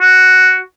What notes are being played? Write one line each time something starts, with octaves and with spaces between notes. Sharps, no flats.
F#4